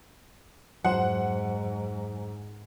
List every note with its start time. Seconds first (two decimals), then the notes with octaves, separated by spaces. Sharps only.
0.85 F2 G#2 F#3 C5 F#5